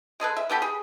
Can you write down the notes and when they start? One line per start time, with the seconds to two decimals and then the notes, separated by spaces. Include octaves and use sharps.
0.20 G#3 G#4 A4 B4
0.37 E5
0.50 B3 G4 A4 B5
0.62 G#4